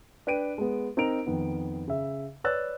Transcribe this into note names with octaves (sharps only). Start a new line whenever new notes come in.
D4 B4 G5 D7 D#7
G#3 B3
C4 D#4 A#4 D7 F7
F2 D#3 B3
C#3 E5
B4 C#5 D5 E6 F#6 A6